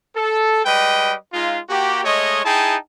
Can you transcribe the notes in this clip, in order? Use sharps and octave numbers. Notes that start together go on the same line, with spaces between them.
A4
G3 G#3 B4 D#5 G5
G#3 D#4 F4
A#3 F#4 G4
G#3 A3 C#5 D#5
D#4 E4 G#4 G5 A5